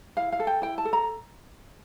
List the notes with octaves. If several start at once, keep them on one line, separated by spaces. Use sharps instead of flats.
E4 F5
F5
A4
G5
E4 G5
A5
A4
A#5